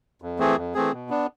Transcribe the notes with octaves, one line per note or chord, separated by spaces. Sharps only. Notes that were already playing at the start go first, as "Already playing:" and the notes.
F2
E3 A3 C4 G#4
F2
E3 A3 C4 G#4
B2
B3 D4